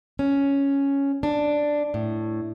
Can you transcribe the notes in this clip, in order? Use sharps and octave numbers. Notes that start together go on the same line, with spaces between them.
C#4
D4
A2